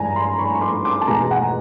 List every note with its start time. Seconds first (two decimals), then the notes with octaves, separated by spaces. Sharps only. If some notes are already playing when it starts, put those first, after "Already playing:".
Already playing: G2 E3 G#3 G#5 A#5
0.16 A#5 C6
0.38 B5 C#6
0.54 C#6
0.61 C6 D6
0.85 C6 D6
1.01 A5
1.08 E2 B2 G#3 G#5 A#5
1.31 F#5 G#5